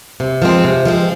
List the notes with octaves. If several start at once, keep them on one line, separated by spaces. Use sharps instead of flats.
C3
F3 G#3 C4
C3
F3 G#3 C4